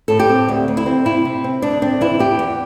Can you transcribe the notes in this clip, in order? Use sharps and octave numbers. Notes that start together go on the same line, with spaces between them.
A2 A4
G4
C4
D2
D2
E4
C4
C3 E4
C3
C4
D2 D4
C4 D4
E3 E4
E2 G4
E2